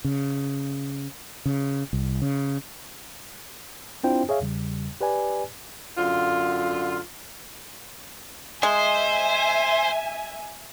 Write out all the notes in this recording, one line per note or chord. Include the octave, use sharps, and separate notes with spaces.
C#3
C#3
C2
C#3
C4 D4 E4 F4 C5 G5
G#4 C#5 E5 F5
E2 C#3 G3
G4 B4 D5 G#5
F#2 D3 F4
G#3 C5 E5 G#5